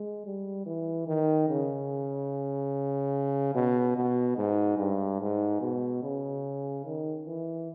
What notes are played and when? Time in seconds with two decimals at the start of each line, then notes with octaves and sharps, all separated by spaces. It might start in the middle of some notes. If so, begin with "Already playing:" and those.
Already playing: G#3
0.26 G3
0.66 E3
1.07 D#3
1.49 C#3
3.55 B2
3.96 B2
4.37 G#2
4.78 G2
5.20 G#2
5.61 B2
6.03 C#3
6.85 D#3
7.27 E3